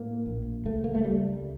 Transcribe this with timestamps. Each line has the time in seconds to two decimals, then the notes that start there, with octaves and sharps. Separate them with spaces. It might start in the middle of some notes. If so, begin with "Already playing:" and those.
Already playing: A2 A#3
0.26 A#1
0.65 C#2 A3
0.84 A#3
0.95 A3
1.04 C#2 G3